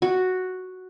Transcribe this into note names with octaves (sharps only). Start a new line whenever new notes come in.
F#4